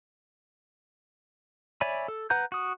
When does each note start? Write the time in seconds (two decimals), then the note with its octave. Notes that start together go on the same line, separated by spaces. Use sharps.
1.81 C#5 D5 E5 G#5 B5
2.08 A4
2.30 B4 F#5 A#5 G6
2.52 F#4 D#6